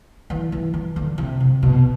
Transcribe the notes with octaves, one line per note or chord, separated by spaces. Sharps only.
E3
E3
E3
D3
C3
C3
B2